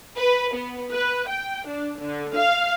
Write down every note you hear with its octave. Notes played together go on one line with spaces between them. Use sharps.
B4
B3
B4
G5
D4
D3
F5